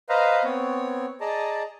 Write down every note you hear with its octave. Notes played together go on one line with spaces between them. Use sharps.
B4 C5 D#5 F5 A#5
B3 C4 C#5
G#4 D5 D#5 A5 A#5